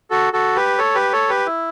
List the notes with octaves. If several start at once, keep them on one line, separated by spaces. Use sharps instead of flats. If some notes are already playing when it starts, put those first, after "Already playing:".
F#4 A4
F#4 A4
G4 B4
A4 C#5
G4 B4
A4 C#5
G4 B4
E4